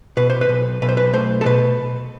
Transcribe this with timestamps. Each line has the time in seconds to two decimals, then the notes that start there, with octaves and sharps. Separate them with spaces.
0.17 B2 B4
0.30 C5
0.41 B4
0.49 B1
0.82 B1 B4
0.89 C5
0.97 B4
1.13 A3 C5
1.41 A4
1.46 B2 B4